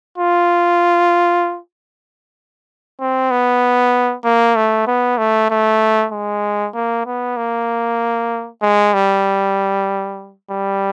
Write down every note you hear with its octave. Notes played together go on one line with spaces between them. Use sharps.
F4
C4
B3
A#3
A3
B3
A3
A3
G#3
A#3
B3
A#3
G#3
G3
G3